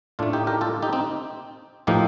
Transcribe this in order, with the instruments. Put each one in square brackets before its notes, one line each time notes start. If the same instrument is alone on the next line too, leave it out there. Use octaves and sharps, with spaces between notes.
[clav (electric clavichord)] A2 A3 D4 F4
D#4 G4
G4 A#4
F4 A4
D#4 G4
C4 D#4
A2 F3 A#3 D#4 G4